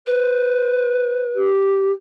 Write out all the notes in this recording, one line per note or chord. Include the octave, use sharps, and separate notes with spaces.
B4 C5
G4